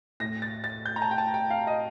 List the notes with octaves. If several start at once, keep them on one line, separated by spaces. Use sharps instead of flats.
A2 A#6
A6
A6
G6
A#5
A5
G5
A5
G5
F5
D#5